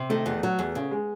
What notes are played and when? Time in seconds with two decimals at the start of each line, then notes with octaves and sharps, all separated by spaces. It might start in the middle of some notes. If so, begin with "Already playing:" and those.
Already playing: C3
0.10 D#3 A3
0.26 E2
0.43 F#3
0.59 E2
0.75 C#3
0.91 G#3